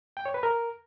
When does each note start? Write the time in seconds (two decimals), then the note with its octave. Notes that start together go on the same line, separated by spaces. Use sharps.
0.17 G5
0.26 C#5
0.34 B4
0.43 A#4